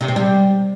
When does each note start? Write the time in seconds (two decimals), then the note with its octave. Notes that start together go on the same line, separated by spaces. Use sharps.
0.01 C3
0.08 C4
0.16 G3